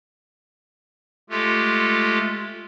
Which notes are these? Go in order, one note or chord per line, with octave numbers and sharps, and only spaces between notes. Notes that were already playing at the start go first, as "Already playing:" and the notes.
G#3 A3 F4 G4 A4